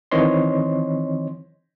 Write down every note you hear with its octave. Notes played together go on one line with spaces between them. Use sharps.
D#3 E3 C4 C#5 D#5 C6